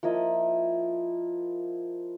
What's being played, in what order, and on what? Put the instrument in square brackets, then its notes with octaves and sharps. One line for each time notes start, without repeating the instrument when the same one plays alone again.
[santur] F3 A#3 E4 D#5